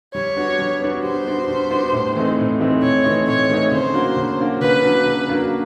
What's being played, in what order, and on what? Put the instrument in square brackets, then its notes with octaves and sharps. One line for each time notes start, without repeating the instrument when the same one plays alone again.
[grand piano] G3 [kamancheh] C#5
[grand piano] B3 D4 F#4
G3
B3 D4 F#4
[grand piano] G3 [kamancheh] C5
[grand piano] B3 D4 F#4
G3
B3 D4 F#4
A2
E3 A3 C4 D#4
A2
E3 A3 C4 D#4
[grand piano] A2 [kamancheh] C#5
[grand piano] E3 A3 C4 D#4
[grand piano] A2 [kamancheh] C#5
[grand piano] E3 A3 C4 D#4
[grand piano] C#3 [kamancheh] C5
[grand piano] F#3 A#3 D4 F#4
C#3
F#3 A#3 D4 F#4
[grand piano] C#3 [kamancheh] B4
[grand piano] F#3 A#3 D4 F#4
C#3
F#3 A#3 D4 F#4